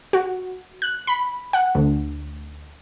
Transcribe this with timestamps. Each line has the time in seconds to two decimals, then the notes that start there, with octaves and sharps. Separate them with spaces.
0.13 F#4
0.82 F#6
1.07 B5
1.53 F#5
1.75 D2